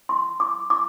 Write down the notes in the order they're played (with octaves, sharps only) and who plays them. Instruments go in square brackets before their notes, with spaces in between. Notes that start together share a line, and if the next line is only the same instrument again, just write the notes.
[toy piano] C6
D6
D6